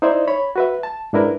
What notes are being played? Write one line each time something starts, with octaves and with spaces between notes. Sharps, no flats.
D#4 E4 C5 D5 E5
C#5 B5
F#4 B4 E5
A5
G#2 D4 E4 A#4 B4